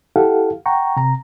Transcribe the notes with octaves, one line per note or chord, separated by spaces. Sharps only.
E4 G4 A4 F5 F#5
F#5 G5 A#5 C#6
C3 A#5